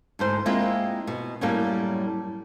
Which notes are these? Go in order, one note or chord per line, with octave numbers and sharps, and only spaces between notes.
D2 G#2 C5
G#3 A#3 C4 E4 F4
B2
F#2 A2 F#3 G3 A#3